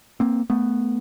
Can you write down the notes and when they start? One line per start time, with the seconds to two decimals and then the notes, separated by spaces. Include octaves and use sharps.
0.20 A#3 C4
0.50 A3 B3